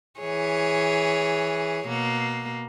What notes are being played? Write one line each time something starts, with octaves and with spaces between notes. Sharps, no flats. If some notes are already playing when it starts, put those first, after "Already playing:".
E3 G#4 C#5
B2 A#3